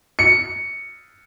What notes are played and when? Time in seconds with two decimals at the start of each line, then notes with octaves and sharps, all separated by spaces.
0.19 C#7